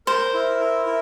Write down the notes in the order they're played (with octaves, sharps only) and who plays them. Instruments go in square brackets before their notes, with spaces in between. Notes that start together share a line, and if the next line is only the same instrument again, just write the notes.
[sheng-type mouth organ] A#4 [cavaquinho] C5
[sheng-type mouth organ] E4
A#4
E4